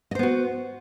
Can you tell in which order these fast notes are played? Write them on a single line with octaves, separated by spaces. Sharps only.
D#5 C5 B3 F#4